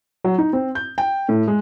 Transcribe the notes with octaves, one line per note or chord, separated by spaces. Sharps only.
F#3
D#4
C4
G6
G5
A2
G#3